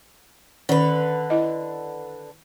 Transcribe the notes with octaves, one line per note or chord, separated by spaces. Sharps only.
D3 D#3 C#4 B4
E4 D#5